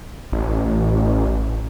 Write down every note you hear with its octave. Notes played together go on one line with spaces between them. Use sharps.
A1